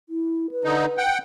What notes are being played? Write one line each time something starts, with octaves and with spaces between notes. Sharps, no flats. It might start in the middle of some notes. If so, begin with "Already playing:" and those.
E4
B4
D3 D#4
F#5 G5